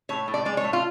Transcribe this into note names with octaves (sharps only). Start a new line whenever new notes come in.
A2 C#5
A2
D5
G#3 D5
C#5
A2
F4